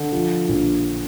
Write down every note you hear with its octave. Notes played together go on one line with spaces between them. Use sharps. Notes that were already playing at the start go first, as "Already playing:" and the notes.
Already playing: D3
F3
A#1